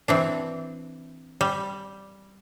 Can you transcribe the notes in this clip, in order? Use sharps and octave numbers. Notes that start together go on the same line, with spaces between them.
E3 C4 D4
G3